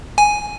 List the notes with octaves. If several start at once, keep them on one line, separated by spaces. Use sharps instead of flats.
G#5